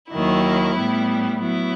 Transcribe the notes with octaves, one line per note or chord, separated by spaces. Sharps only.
D#2 D#3 F#3 E4
A2 G3 B3
F#3 B3 E4